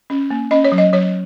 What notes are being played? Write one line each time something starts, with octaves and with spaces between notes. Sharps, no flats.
C#4
A#3
C#4 D#5
C#5
F#3
D#5
F#3 C#5